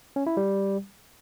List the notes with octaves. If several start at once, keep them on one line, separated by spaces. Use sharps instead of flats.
C#4
E4
G3